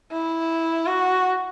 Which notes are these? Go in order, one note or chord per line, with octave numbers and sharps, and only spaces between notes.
E4
F#4